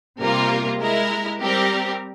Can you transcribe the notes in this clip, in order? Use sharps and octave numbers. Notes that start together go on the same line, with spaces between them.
C3 G3 A#3 F4 A#4
G#3 E4 A#4
G3 C4 G4 A#4